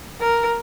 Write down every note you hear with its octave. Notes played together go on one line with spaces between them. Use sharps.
A#4